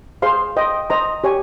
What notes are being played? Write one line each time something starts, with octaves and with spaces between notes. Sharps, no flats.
G#4 C5 F5 C6
C5 D#5 G5
C5 D#5 A#5
G4 C#5 G#5